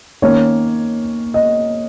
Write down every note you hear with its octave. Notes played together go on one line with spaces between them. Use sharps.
D#3 A#3 C#4 C#5
D#5